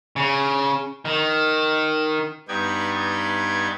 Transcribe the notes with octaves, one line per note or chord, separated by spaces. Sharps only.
C#3
D#3
G2 B3 D#4 D5 G5 G#6